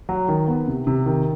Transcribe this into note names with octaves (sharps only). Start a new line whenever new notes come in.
F#3
D#3
B3
C3
C3
D#3